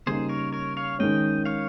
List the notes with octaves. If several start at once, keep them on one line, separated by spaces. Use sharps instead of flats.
C#3 G3 A#3 D#4 G#4 C5
A#4 C#5
A#4 C#5
C#5 F5
D#3 G#3 C#4 D#5 G5
C#5 F5